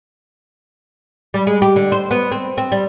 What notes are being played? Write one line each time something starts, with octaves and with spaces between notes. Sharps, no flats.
G3
G#3
G4
D3
C5
B3
C4
C4
G3